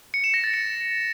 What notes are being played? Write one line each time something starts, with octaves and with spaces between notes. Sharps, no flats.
C#7
E7
A#6
A6
C#7